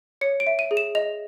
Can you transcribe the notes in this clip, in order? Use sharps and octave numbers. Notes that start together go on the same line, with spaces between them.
C#5 C#7
D7
E5
D#7
G#4
E7
D#5 F7